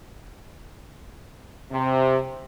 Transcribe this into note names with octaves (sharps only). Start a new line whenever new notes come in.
C3